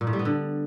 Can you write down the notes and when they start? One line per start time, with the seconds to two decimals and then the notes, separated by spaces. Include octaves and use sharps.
0.01 A#2
0.07 A2
0.13 G3
0.19 B3
0.25 D3